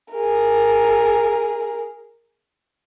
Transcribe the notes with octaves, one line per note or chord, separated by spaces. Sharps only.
G#4 A#4